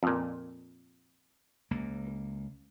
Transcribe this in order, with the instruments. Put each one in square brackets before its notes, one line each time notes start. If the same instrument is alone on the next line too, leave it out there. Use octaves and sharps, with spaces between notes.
[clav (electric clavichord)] F2 A#2
[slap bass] C#2 A#3